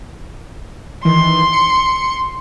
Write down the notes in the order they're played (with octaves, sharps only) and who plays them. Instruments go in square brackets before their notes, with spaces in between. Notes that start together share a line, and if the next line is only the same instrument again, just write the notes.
[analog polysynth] D#3 E3 [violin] C6
[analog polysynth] C#7